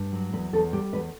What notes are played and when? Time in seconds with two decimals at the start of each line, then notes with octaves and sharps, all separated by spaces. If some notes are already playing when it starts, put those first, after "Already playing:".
Already playing: G2
0.13 F#3
0.33 E2 B4
0.53 E2 A4
0.73 G3 G4
0.93 E2 B4